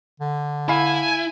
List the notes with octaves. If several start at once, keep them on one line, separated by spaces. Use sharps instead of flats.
D3
E4 F5 G#5 B5